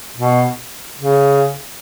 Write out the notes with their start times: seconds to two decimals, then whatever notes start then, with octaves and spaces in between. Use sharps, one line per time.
0.17 B2
0.97 C#3